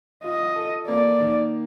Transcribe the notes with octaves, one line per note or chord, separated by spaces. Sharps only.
F4 D#5
A4
A#3 D5
D#3